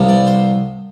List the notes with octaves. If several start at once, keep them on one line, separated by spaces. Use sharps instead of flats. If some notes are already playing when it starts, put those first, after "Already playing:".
Already playing: C2 C3 F3 B3
D5
C5